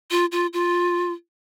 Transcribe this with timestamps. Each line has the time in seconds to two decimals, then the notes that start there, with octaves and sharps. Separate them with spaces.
0.11 F4
0.32 F4
0.53 F4